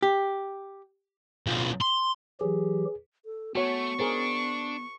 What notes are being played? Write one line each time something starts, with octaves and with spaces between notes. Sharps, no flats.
G4
B1 F3
C6
E3 F#3 G4 G#4
A4
A3 B3 F#4 C#5 F#5 C#6
D4 G#4 A#4 C5